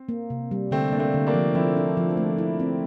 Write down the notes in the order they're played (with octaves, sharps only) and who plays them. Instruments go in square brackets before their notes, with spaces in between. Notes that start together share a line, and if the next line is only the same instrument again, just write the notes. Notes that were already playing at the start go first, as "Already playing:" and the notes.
Already playing: [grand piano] C4
[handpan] A#3
C3
G3
[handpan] D3 [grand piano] A3 C4
[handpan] A#3 [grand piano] D4
[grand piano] A3 C4
[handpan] D3
[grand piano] A#3 D4
[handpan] F3
[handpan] F3 [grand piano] C4 E4
[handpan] D4
F3
A3
E4
C4